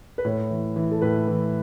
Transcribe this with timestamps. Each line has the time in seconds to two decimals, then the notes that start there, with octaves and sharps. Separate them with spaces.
0.18 B4
0.25 A2 C#5
0.50 E3
0.76 E3
0.91 A4
1.02 A2 B4
1.28 E3